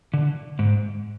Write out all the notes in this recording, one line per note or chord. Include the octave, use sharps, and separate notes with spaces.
D3
G#2